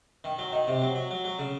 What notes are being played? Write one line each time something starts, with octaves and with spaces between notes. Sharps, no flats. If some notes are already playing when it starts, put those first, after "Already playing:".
D#3
F#3
D#3
C3
F#3
F#3
F#3
F#3
C#3